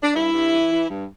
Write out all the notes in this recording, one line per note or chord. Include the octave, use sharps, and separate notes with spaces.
D4
G2 E4
G2
E3
E3
G2